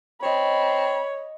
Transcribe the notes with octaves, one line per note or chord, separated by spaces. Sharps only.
C4 C#5 D#5 B5 E6